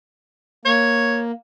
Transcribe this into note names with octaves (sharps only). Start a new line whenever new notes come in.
A#3 C#5